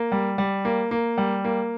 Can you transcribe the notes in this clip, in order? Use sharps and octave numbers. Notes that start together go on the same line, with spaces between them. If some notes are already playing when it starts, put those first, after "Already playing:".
Already playing: A#3
G3
G3
A#3
A#3
G3
A#3